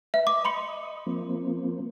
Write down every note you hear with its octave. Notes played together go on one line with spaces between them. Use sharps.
B4 E5
D#5 D6
B5 C6 C#7
F3 A#3 C4